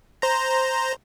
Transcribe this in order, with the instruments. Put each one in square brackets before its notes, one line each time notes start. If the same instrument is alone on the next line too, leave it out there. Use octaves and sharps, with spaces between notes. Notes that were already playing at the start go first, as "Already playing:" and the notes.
[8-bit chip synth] C5 A#5